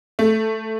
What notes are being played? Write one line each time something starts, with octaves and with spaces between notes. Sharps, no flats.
A3